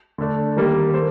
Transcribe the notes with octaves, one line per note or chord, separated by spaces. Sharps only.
D3 A3 D4
D#3 G3 A#3
A4 C5